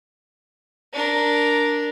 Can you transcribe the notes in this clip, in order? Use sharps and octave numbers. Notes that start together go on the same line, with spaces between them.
D4 A#4